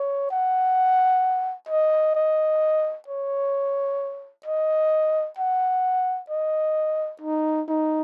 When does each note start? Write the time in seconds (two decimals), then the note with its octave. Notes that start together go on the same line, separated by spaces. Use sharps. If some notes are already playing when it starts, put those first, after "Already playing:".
Already playing: C#5
0.31 F#5
1.69 D#5
2.15 D#5
3.08 C#5
4.46 D#5
5.39 F#5
6.30 D#5
7.22 D#4
7.68 D#4